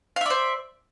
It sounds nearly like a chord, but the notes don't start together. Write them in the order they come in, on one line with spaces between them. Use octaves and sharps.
F5 E5 D5 C5